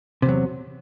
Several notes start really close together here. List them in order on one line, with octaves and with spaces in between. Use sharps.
C3 E2 F#3